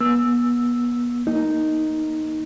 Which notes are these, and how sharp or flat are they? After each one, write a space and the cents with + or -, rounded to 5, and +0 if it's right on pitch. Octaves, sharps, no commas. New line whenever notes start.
B3 -35 E6 +0
A#3 +0 D#4 +0